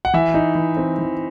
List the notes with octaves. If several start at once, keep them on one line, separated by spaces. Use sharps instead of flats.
F#5
E3 E5
D#4
E3
C4
E3